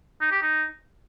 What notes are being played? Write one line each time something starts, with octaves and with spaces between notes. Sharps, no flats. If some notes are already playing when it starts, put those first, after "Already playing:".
D#4
G4
D#4